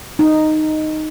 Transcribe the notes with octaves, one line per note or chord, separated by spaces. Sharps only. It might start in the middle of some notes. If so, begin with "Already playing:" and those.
D#4